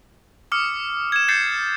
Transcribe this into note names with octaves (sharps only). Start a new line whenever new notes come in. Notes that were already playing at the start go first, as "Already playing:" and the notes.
D6 D#6 F6 C#7
G#6 E7
G6 A6 C7 C#7